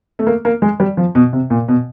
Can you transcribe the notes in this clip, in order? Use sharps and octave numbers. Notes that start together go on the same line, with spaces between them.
A3
A#3
A#3
G#3
G3
F3
B2
C3
A#2
B2